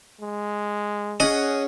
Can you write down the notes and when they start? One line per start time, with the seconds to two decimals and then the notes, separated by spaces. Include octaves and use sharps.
0.21 G#3
1.20 C#4 G#4 D#5 F#5